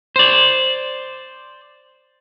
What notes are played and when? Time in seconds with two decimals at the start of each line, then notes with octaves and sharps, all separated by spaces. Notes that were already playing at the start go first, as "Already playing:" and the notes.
0.16 C5 D5